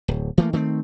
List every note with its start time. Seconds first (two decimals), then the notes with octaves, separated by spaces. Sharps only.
0.08 D1
0.38 E3 A3 A#3
0.53 D#3 A3 B3 C4